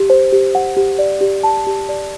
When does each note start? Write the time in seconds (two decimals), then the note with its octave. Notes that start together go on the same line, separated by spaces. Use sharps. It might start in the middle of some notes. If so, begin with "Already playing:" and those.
Already playing: G4
0.10 C5
0.33 G4
0.55 F#5
0.77 G4
0.99 D5
1.21 G4
1.43 A5
1.67 G4
1.89 D5